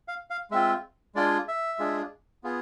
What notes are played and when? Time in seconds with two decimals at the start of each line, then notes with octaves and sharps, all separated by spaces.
0.08 F5
0.30 F5
0.51 G#3 C4 F4 E5
1.15 G#3 D4 F4 G#4 D5
1.48 E5
1.79 G#3 D4 F4 G#4
2.44 B3 F4 G#4